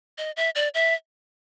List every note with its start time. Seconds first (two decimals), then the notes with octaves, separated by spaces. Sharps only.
0.18 D#5
0.37 E5
0.55 D5
0.74 E5